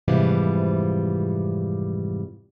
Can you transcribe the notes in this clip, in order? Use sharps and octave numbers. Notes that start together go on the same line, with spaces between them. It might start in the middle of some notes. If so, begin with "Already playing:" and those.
F2 G#2 C3 E3 G3 F4